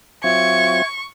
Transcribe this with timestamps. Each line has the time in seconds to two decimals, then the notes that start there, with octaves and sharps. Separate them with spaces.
0.24 F#3 C4 F4 E5 C#6 G#6